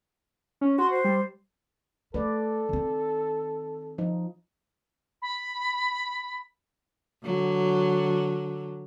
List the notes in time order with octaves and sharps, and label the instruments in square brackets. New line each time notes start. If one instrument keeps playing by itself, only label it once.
[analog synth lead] C#4
[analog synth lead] F#4 [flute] C6
[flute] C5
[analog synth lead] G3
[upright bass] A3 [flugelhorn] A4 [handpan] B4 D5
[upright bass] D#3 C4
[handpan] F3 D#4
[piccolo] B5
[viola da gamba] D3 F#3